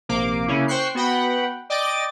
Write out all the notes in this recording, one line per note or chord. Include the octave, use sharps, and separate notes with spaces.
A#1 C3 A#3 D6
C#3 A#3 C#4 E4
C5 G5 C#6 F#6 C7
B3 F#4 F#5 G5 B5
D5 D#5 G5 D6 A6